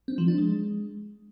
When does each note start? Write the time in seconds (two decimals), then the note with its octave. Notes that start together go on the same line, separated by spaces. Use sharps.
0.08 C4
0.18 F3
0.28 D4
0.38 G#3